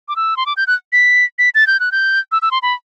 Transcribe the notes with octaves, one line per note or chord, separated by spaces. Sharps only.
D6
E6
C6
D6
G6
F#6
B6
B6
A6
G6
F#6
G6
E6
E6
C6
B5